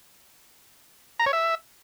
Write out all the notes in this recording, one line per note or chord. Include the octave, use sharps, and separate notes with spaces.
A#5
C#5
E5